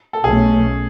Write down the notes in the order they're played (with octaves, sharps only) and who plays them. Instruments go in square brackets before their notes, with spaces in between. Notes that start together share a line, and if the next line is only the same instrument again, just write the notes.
[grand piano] A4
[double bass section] B1 B2 A3 C#4 [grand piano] G#4